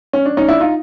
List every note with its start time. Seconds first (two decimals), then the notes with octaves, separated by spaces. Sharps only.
0.13 C#4
0.25 D4
0.37 C#4 D#4
0.48 D4 E4
0.60 D#4 F4